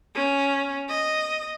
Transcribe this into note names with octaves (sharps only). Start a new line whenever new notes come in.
C#4
D#5